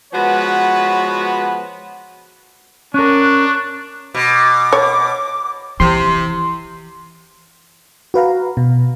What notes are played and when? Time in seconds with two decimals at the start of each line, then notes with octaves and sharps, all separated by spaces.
0.14 F3 G#3 B3 F#4 B4 C#5
2.94 C#4 D4 A#4 C#6 F#6
4.14 B2 D6
4.73 C#5
5.80 C3 E3 C6
8.14 F#4 B4 F5 A#5
8.57 B2